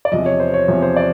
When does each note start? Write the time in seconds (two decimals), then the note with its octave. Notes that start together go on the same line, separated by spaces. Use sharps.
0.05 D5
0.12 E2 C3 F3 D#5
0.26 C#5
0.40 C5
0.54 C#5
0.68 E2 C3 F3
0.82 C5
0.97 D5